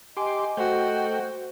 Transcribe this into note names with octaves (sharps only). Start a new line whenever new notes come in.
G4 D#5 G#5 C6 D6
A3 F#4 C5 G5